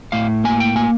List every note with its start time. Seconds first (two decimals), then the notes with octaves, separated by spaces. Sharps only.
0.12 A2 F5
0.44 A#3 G#5
0.60 G5
0.76 A#3 G#5